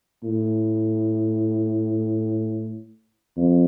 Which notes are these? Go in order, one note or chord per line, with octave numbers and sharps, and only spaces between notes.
A2
F2